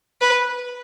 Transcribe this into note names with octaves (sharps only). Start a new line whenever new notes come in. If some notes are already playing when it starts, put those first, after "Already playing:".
B4